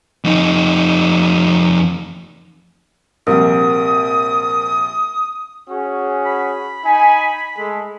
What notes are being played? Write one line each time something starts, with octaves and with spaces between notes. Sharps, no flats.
F2 D#4
A#1 C3 G3 A#4 F#5 D#6
C#4 F#4 G#4
B5
D#4 G#5
G#3 A3 A4